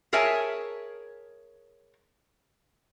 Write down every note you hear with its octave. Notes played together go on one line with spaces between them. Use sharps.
G#4 A#4 C#5 E5 G#5 A5